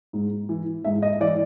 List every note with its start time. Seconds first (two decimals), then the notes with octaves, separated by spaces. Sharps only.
0.13 G#2
0.49 E3
0.85 G#2 E5
1.02 D#5
1.20 E3 D5